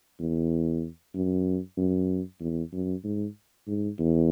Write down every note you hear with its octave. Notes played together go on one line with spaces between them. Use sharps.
E2
F#2
F#2
E2
F#2
G#2
G#2
E2